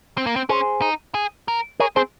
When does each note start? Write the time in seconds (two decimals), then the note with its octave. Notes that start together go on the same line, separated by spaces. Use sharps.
0.18 C4
0.26 A#3
0.36 C4
0.49 C#4 G#4 C5
0.82 D#4
1.15 G#4
1.48 A#4
1.80 G#4 A#4 C#5
1.96 C4 G#4 C5